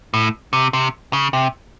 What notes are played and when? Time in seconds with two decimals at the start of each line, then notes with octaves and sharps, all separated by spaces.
0.14 A2
0.53 C3
0.73 C3
1.13 C#3
1.33 C3